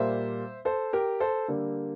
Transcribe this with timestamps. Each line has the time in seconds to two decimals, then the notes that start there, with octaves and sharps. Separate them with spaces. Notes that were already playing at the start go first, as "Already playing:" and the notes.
Already playing: A#2 G3 A#3 C5 E5
0.65 A4 C5
0.93 G4 A#4
1.20 A4 C5
1.48 D3 G3 A#3